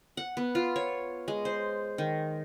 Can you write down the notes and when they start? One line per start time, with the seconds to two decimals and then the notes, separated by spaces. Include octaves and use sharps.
0.17 F#5
0.37 B3
0.55 F4
0.76 C#5
1.28 G#3
1.45 C5
1.98 D#3